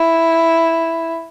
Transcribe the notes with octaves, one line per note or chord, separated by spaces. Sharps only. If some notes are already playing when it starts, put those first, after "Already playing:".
Already playing: E4